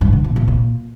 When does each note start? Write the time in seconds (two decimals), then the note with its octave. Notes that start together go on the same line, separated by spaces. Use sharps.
0.01 G2
0.13 D3
0.24 A#2
0.36 A#2
0.48 A#2